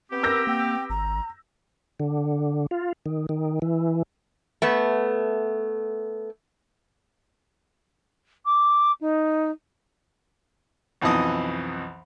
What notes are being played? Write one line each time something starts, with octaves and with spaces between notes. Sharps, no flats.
B3 C4 G4
A#4 E6 G6 A#6
A#3 G5
G#1 A#5
D3
F4
D#3
D#3
E3
A3 B3
D6
D#4
B1 F2 E3 D#4 D#5 D#6